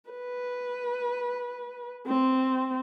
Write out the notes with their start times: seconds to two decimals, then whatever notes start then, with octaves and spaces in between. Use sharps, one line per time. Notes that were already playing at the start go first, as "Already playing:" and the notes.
0.11 B4
2.07 C4